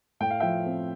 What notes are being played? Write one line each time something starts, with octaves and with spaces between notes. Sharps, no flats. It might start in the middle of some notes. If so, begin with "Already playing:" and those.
A2 G5
F5
F3 E5 G5
C4